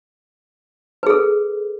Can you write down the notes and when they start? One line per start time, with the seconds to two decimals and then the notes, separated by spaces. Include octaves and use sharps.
1.03 B4
1.07 G#4
1.10 A4